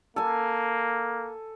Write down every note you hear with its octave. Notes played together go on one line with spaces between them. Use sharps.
A#3 A4 G#5